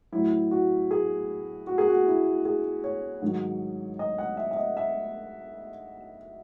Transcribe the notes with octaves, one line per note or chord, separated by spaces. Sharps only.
A2 F#3 E4
F#4
G#4
F#4
G#4
F#4
E4
G#4
C#5
G#2 D#3 F#3
D#5
F#5
E5
E5
D#5
E5